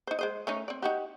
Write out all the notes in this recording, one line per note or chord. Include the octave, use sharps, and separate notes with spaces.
D#4 C5
G#3 C5 D#5
A3 C#4 D#4
C4 D5
D#4 F#4 G4